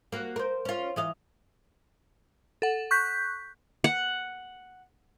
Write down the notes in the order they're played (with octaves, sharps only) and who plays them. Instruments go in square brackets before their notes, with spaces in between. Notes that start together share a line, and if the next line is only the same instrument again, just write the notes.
[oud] A#3 F#4
A#4 C5
C#4 F4
E3 D#5 F5
[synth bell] A4 F#5
C#6 F#6 G6 B6
[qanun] F#5